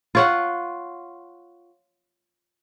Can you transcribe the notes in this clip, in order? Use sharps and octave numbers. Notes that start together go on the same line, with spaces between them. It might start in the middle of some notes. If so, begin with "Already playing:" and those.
F4 C#5 F#5